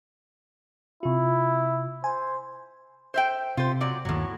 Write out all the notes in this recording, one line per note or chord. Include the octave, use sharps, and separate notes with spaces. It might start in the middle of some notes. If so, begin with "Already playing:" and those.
C3 E4 F4
C5 G#5
C5 E5 G5
C3 F4 C5
A#2 F#3 D5
G1 D#2 A2 F#3